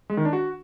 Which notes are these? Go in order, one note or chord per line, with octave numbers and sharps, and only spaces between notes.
G#3
D#3
D4
F#4